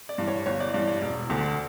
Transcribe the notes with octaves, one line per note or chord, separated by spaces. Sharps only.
D5
G2 E3
C#5
G1 C#5
D5
G2 E3 D5
D5
E1
D2 D3